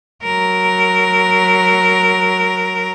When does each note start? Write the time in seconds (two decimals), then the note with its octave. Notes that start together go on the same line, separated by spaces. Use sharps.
0.23 F#3 A#4